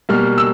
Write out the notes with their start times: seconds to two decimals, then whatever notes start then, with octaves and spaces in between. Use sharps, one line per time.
0.09 B2 G3 A#3 F6
0.38 E6